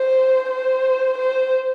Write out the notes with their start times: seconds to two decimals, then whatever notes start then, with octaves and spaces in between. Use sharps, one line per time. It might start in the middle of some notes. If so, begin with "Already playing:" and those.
Already playing: C5
0.50 C5
1.18 C5